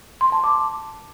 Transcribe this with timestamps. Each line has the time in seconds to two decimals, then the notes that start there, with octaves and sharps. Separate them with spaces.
0.21 C6
0.32 A5
0.44 D6